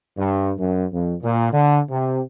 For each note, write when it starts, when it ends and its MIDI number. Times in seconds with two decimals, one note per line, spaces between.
0.17 0.52 43
0.58 0.85 42
0.92 1.14 41
1.23 1.49 46
1.52 1.80 50
1.90 2.21 48